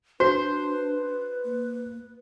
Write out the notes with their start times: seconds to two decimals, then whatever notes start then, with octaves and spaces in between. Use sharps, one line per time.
0.20 D4 F#4 B4 C5
1.45 A#3